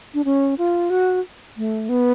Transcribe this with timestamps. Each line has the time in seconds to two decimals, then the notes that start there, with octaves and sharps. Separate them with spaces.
0.14 D4
0.25 C#4
0.58 F4
0.90 F#4
1.57 A3
1.89 B3